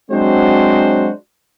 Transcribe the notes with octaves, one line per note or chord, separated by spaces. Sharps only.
F#3 G#3 C4 D4 F#4 C5